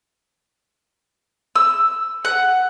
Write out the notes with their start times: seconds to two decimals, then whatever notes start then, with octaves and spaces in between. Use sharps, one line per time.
1.56 E6
2.25 F#5